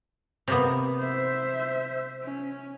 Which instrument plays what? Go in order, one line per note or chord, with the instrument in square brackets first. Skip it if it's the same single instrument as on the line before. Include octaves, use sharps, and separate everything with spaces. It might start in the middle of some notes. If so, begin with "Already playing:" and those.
[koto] C3 A#3 B3
[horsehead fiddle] C5 E5
C#4